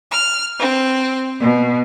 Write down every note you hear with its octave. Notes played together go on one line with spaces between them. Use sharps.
F6
C4
B2